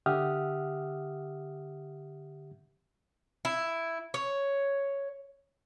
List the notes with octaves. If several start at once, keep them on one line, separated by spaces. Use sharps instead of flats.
D3 G4 E5 F#5 D#6 F6
E4
C#5